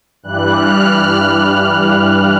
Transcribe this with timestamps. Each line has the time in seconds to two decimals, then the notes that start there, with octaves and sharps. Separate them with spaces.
0.23 G2 E3 G3 F#6
0.55 F6